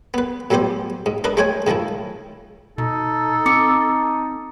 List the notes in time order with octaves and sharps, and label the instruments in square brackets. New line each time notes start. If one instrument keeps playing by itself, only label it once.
[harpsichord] B3 B4
A2 F#3 G3 B3 G4 C5
G#2
D4 A#4 B4 D#5
G#3 A3 C5 C#5 G5 G#5
G#2 D#3 F3 A3 E4
[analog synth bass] B2 [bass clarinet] D#4 [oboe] A4
[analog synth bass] C4 [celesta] D6 C#7